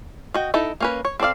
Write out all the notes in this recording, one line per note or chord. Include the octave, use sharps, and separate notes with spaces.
F#4 D#5 G5
D#4 E4 A4
A#3 C#4 B4
C#5
C4 A4 D5 F5